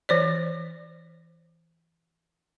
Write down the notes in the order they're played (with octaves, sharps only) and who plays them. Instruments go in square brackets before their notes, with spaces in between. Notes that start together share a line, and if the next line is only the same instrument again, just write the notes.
[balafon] E3 C5 D5